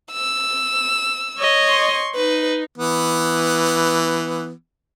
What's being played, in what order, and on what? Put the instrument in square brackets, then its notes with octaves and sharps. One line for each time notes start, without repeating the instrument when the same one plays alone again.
[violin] E6
[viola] C#5 D#5
[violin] C6 C#6
[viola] D#4 [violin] B4
[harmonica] E3 B3